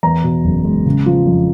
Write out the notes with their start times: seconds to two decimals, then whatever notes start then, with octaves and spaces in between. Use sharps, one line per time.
0.03 E2 A#5
0.23 B2
0.44 F#1
0.65 G#3
0.85 C#3
1.06 F3
1.27 F2